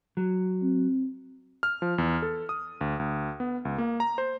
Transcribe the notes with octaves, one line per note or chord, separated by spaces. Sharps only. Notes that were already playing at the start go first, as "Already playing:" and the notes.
F#3
C4
F6
F3
E2
A4
D#6
D2
D2
B3
C#2
A#3
A#5
C5